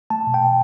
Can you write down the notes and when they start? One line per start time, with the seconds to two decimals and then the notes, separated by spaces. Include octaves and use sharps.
0.10 A3 A5
0.27 B2
0.34 G5
0.42 B2